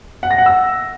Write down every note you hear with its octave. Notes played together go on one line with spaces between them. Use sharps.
F#5
A#6
F#5
E6